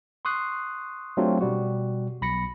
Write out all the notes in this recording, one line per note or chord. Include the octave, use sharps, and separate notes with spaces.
C6 C#6 D#6 F#6 C7
F#3 A3 C4 D4 F4 G4
B2 G3 F#4
B1 B5 A#6 C#7